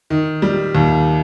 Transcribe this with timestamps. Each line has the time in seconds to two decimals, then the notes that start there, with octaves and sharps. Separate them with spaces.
0.10 D#3
0.42 G3
0.75 D#2